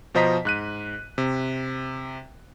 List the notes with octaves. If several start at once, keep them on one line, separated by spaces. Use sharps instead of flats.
B2 F3 C5 D#5 A#5 B6
G#2 F#6 D#7
C3